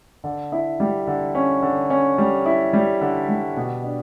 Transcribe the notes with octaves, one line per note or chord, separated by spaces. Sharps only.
D3
E4
G3
D3
C#4
D3
C#4
G3
E4
G3
D3
G3
B2
D4